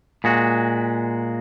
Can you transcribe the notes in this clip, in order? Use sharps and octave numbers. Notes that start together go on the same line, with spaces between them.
A#2 G#3 F#4